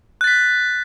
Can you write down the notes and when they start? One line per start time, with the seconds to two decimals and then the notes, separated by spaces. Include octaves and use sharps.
0.21 F#6
0.24 A6
0.27 B6